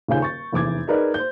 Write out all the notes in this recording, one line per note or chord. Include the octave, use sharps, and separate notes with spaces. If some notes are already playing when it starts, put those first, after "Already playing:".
D#1 G#2 C#3 F4 G#5 G6
C#6 A6
F1 E2 D6 G#6
D#4 G#4 A#4 B4 D5 D#5
C5 G6